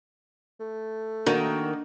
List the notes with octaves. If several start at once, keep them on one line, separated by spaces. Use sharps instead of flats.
A3
D#3 A#3 D4 F#4 D5 D#5